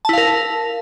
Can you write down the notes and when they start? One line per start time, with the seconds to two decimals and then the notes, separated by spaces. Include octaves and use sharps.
0.05 A5
0.09 E4
0.13 F5
0.18 A#4